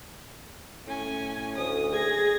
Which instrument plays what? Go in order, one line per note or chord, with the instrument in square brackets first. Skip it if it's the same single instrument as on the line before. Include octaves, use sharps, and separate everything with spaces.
[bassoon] A2 [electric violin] C#4 G#5
[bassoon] D2 [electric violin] D#6
[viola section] G#4 [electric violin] G#6 A#6